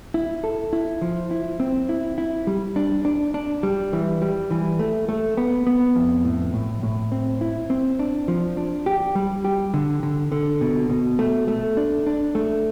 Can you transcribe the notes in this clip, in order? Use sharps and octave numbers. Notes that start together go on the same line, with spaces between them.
E4
A4
E4
F3
E4
C4
E4
E4
G3
D4
D4
D4
G3
E3
G3
E3
A3
A3
B3
B3
F2
A2
A2
A2
C4
E4
C4
D4
F3
D4
G4
G3
G4
D3
D3
D3
B2
B2
A3
A3
D4
D4
A3